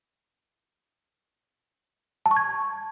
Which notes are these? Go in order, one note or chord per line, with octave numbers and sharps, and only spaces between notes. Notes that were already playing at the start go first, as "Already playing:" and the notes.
A5
C#6
G#6